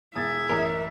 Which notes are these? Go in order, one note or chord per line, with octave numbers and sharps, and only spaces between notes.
E1 G#4 E5 G#6 A6
A1 F#2 A#4